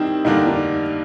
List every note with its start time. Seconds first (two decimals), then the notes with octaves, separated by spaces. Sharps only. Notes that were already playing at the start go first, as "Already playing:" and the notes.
Already playing: D#3 G3 C4 D#4 E4
0.25 G2 D3 G3 A#3 D4 D#4
0.47 D#4